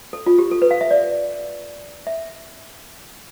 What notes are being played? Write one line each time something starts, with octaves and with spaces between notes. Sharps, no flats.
A4
F4
G4
A4
B4
F5
E5
D5
E5